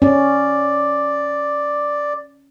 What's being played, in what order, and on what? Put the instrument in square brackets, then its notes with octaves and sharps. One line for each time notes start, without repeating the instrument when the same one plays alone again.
[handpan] C#4 [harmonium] D5